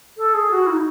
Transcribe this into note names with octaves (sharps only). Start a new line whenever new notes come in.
A4
G#4
F#4
E4
D#4